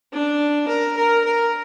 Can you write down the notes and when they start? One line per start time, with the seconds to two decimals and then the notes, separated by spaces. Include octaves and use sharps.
0.12 D4
0.68 A#4
0.97 A#4
1.25 A#4